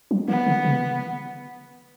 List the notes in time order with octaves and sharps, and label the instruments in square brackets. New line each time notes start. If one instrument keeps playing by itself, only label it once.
[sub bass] F#3
[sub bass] E3 [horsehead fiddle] B3
[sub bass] D3
C#3